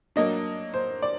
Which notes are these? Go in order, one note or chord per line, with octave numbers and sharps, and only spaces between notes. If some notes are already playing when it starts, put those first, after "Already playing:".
F#3 A#3 D4 D#5
C5
D5